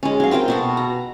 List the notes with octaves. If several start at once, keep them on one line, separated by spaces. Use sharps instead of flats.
G#3 C#4
F#3 F5
C4 F4 A#4 G5
B2 F#4 A4
A#5